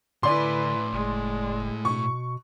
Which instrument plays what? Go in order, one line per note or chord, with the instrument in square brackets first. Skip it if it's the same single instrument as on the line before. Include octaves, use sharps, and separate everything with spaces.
[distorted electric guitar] A2 G#5 [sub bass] D3 [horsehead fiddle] E4 B4 [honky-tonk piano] D5 C6
[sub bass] F#1 [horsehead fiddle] G#3
[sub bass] B2 [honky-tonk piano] C#6